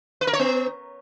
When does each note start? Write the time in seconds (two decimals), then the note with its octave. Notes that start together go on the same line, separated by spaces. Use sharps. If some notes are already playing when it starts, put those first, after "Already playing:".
0.21 B4
0.27 A#4
0.33 C#5
0.39 B3